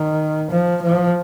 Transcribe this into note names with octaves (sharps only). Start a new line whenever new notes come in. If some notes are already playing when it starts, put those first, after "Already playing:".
Already playing: D#3
F3
F3